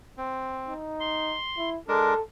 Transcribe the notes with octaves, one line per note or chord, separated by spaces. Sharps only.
C4
D#4
C6
E4
G#3 D4 A4 A#4